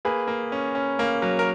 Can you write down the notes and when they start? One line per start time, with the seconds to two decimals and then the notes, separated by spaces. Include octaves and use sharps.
0.05 A#3 G#4 B4
0.28 A#3
0.52 C#4
0.75 C#4
0.99 A#3
1.22 F#3
1.39 A#4